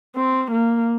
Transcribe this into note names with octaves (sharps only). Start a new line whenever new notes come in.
C4
A#3